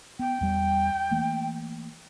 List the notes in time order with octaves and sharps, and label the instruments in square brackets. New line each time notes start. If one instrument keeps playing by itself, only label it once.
[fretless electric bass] B3 [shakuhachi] G5
[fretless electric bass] E2 G3
E3 A3 A#3